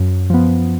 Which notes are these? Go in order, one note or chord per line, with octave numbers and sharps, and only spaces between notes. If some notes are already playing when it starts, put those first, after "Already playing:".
Already playing: F#2
F3 B3